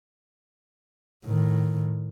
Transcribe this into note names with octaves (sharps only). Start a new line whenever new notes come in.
A2 D#3